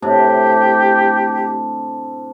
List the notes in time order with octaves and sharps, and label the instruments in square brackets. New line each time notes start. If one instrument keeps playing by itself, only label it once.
[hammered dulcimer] A2 C3 D4 [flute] G4